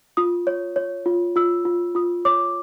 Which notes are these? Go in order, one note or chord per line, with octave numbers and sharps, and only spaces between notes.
F4 D#6
C#5
C#5
F4
F4 E6
F4
F4 D#6
C#5 D6